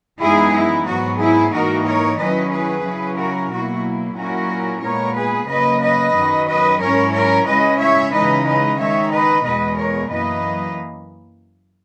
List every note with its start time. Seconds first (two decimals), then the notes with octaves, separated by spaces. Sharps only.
0.21 F#2 E3 G#3 B3 D#4 E4 G#4
0.54 E4
0.87 G#2 F#3 B3 F#4
1.19 E4 G#4
1.52 G#2 E3 A#3 D#4 F#4 A#4
1.86 A#4 C#5
2.18 D#3 F#3 C#4 E4 B4 D#5
2.52 G#4 B4
2.85 C#3 F#3 C#4 E4
3.18 F#4 A#4
3.51 B2 F#3 A#3 E4 F#4
4.16 A#2 F#3 C#4 E4 F#4 A#4
4.82 A#2 G#3 B3 A#4 C#5
5.16 G#4 B4
5.49 C#3 F#3 A#3 B4 D#5
5.82 B4 D#5
6.14 F#2 D#3 F#3
6.47 B4 D#5
6.80 G#2 F#3 C#4 E4 A#4 C#5
7.13 A#4 C#5
7.46 C#3 G#3 C#4 E4 B4 D#5
7.79 C#5 E5
8.12 C#3 E3 G#3 D#4 B4 D#5
8.46 B4 D#5
8.79 D#3 G#3 D#4 C#5 E5
9.11 B4 D#5
9.44 E2 B2 G#3 B3 B4 D#5
9.78 A#4 C#5
10.10 F#2 E3 A#3 B4 D#5